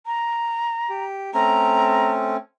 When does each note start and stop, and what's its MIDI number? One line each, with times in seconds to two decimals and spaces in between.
0.06 1.04 82
0.89 1.31 67
1.34 2.37 57
1.34 2.37 60
1.34 2.37 61
1.34 2.11 82